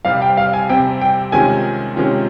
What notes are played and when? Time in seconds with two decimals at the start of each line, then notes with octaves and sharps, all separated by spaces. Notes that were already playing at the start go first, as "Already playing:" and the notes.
0.05 C3 G3 C4 F5
0.22 G5
0.37 F5
0.53 G#5
0.69 C3 G3 C4 G5
1.01 G5
1.32 C3 D#3 G#3 C#4 F4 G#5
1.96 C3 D#3 G#3 C#4 F4